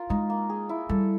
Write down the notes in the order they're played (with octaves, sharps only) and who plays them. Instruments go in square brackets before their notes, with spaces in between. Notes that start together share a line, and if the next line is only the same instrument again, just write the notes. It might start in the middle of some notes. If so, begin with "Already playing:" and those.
Already playing: [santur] F4 A#4
[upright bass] G#3 [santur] D#4
[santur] A#3
G#4
E4
[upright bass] G3 [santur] A4